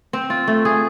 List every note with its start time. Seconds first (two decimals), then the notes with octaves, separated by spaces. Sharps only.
0.13 C4
0.30 F4
0.47 A3
0.65 G#4